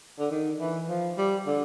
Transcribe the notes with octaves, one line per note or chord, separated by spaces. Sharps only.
D3
D#3
E3
F3
G3
D3